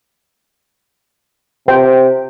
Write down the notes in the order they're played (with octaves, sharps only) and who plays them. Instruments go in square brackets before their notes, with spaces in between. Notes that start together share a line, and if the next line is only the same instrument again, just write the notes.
[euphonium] C3 [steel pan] C5 G5